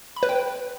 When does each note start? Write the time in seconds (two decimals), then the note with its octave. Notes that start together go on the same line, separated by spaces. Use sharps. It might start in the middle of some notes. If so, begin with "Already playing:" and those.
0.16 B5
0.23 B4
0.29 G5